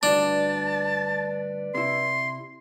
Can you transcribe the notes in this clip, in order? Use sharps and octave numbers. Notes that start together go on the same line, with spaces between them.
D2 G2 D4 B4 D5 A5
C3 E4 C6